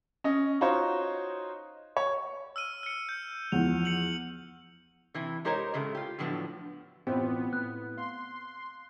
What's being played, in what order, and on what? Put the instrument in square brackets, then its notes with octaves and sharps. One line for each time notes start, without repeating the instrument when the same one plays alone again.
[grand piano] C#4 D#5
D#4 F4 F#4 C5 C#5
C#5
[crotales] E6 F6 D#7
F6 C#7
G6
[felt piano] E2 F3 F#5 [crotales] F7
[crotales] C#7 F#7
[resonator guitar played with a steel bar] C3 E3 E4
G#3 D#4 G4 A#4 C5 C#5
A2 C#3 G#3 A3
F4 G4
A2 D3 F3 F#3 B3
[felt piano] A1 B2 F4 [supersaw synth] B3 [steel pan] C4 G4
[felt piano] A2 [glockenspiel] F#6
[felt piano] F5 [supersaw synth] C6